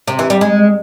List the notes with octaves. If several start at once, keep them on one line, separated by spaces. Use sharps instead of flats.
C3
E3
G3
G#3